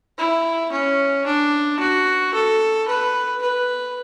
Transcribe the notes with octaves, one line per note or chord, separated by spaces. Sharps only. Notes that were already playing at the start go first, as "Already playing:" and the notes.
E4
C#4
D4
F#4
A4
B4
B4